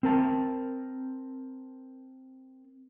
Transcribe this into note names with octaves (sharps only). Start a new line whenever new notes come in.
C4 A#4 A5